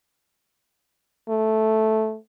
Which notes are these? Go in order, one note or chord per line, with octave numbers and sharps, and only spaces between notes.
A3